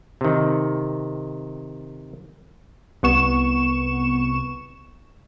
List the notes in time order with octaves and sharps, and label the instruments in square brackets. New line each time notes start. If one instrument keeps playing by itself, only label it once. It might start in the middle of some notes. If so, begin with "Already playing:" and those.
[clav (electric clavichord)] C3 D#3
[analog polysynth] C2 B3 C#6 E7